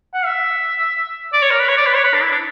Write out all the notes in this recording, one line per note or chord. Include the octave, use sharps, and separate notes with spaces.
F#5
E5
D5
C#5
A#4
B4
C#5
D5
B4
C#5
B4
D4
E4
D4